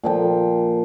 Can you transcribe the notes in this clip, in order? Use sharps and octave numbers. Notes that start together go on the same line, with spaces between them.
A#2 F3 G5